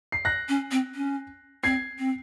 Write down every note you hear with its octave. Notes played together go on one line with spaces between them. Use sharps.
C7
F#6 A#6
C#4
C4
C#4
C4 G#6 C7
C4